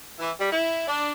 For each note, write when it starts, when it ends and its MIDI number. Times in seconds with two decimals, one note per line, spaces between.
0.18 0.30 52
0.38 0.50 55
0.51 0.83 64
0.86 1.11 62